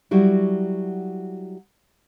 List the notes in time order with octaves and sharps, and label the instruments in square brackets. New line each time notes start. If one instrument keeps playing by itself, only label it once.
[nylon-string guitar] F#3 G3 E4 F#4